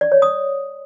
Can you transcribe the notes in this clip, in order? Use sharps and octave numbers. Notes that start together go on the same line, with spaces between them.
D5
C#5
D#6